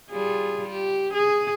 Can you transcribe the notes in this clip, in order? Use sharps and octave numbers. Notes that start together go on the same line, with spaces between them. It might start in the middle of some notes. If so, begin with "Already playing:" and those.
G3 F4 G#4
G4
G#4